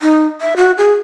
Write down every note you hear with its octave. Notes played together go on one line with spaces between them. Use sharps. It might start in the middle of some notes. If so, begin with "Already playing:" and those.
D#4
E5
F#4
G#4